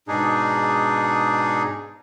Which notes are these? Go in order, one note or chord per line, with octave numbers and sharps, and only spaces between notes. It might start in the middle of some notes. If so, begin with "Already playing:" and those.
G#2 B2 D4 D#4 G#4